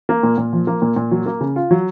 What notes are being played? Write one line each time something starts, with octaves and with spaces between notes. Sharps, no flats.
A#3
A#2
A#2
F3
A#3
A#2
A#2
F#3
A#3
C#3
F4
F#3